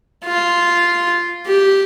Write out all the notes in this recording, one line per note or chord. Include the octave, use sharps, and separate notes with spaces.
F4
G4